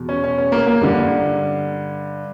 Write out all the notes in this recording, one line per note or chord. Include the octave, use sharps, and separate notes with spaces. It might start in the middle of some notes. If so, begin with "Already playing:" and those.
Already playing: E2 B2
C#4
C#4
C#4
A#3
A#3
G2 D3